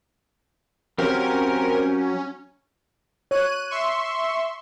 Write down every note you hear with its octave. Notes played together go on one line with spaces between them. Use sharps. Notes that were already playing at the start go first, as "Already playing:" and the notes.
F#3 C4 C#4 G4 A#4 F5
C#5 F#6 D#7
E5 C6 C#6